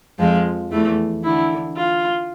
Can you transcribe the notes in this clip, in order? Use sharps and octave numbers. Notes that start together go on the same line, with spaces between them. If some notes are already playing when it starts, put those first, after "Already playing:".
F2 F3 G#3
E2 E3 A3
D3 E4
F4